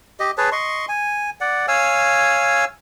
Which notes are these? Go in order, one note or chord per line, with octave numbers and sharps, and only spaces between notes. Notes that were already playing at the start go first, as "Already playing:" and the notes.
G4 D#5
G#4 B4 C#5 A5
D#5 C6 C#6
G#5
D5 F#5
C#5 F5 G#5 E6